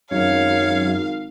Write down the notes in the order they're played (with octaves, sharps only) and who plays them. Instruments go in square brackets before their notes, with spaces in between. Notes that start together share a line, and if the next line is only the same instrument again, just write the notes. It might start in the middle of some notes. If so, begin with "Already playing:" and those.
[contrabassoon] G#1 [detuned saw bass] F#2 [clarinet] C#5 [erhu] F5